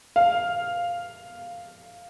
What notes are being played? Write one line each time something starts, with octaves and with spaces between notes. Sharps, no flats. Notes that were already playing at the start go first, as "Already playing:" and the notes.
F5